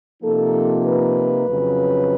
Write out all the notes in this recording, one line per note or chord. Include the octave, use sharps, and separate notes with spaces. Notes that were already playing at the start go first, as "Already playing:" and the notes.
C3 F3 A#3 D#4 A4
B4
F2 C#3 F#3